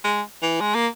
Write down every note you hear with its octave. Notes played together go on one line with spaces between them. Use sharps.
G#3
E3
G#3
A#3